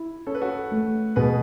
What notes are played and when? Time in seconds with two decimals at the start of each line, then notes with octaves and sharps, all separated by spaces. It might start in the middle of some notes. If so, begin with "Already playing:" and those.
Already playing: E4
0.27 C#4 A4
0.34 B4
0.41 F#4 A4
0.72 A3
1.16 B2 G#4 B4